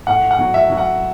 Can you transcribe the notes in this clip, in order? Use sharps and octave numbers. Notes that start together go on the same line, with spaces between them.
A2 F#5
F#5
F#3
E5
F#3
F#5